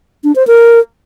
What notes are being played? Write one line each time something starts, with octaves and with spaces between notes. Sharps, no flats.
D4
C5
A#4